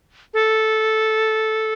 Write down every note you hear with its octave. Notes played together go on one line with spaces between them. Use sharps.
A4